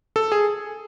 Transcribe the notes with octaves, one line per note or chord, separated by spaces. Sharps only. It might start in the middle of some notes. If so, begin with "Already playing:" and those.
A4
G#4